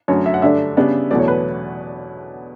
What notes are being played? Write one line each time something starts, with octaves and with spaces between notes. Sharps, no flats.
F#2 D3 F#3 A3 C#5
E5
F#5
G2 D3 A3 D4 E5
C#3 G3 B3 D4
E2 B2 F#3 A3 D5
C#5
B4